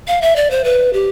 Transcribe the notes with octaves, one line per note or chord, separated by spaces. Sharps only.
F5
E5
D5
C5
B4
G4